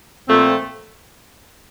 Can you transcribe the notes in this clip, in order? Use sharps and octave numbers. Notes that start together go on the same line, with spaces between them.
A#2 F3 A3 C4